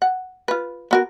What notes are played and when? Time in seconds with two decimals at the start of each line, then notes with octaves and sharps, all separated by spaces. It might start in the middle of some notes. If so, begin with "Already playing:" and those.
0.02 F#5
0.48 F4 B4
0.91 B3 F#4 A#4